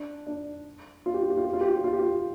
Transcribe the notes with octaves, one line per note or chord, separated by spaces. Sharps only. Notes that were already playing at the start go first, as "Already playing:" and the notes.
Already playing: D4
D4
F4
G4
F4
G4
F4
G4
F4
G4
F4
G4
F4
G4
F4